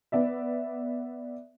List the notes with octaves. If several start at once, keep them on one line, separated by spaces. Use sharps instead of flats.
B3 D5 E5